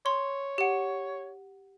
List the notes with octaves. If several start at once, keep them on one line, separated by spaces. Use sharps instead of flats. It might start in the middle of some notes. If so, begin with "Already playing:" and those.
C#5 C6
G4 F#5